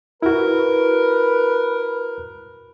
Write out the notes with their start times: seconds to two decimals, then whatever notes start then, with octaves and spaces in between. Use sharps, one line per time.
0.22 E4 F#4 A#4 B4